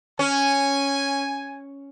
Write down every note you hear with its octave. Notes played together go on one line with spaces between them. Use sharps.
C#4 G#5